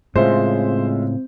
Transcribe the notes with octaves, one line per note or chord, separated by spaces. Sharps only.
A2 C#3 G#3 C4 F4 C5 E5